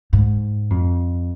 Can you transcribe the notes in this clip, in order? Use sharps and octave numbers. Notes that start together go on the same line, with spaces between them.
G#2
F2